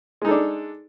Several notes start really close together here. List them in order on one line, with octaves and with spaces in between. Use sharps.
G#3 D#4 A4 D4